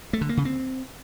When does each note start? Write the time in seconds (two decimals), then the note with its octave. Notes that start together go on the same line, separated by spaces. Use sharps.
0.13 A3
0.21 D3
0.29 A#3
0.37 C#3
0.45 C4